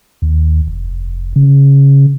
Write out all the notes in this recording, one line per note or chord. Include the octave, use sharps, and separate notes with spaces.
D#2
F1
C#3